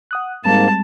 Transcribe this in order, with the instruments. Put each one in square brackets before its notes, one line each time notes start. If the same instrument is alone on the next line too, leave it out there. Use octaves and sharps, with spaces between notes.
[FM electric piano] F#5 D#6 F#6
[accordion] G#2 A#3 [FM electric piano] G3 G#3 C4 [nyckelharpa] A5